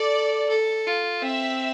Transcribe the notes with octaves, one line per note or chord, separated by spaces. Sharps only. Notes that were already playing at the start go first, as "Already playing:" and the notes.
Already playing: A4 D5
A4
F4
C4 E5